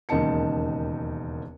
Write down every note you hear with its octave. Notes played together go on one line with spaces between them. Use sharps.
E1 D#2 C#3 D#4 A5 C#7